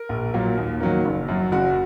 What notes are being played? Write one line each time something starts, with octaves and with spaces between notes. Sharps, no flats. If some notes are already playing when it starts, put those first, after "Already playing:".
Already playing: A#4
A#1
A#2 F#3 A#3
D#2
D#3 F#3 A#3
F#1
F#2 F#3
F#1 F#4